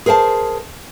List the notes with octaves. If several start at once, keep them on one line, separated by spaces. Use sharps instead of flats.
G#4 A#4 C5 G5 A5